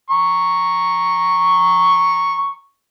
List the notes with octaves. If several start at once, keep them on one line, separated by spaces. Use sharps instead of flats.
A#5 C#6